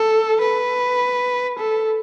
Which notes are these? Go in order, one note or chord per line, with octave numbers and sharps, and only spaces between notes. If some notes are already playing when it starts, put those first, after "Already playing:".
Already playing: A4
B4
A4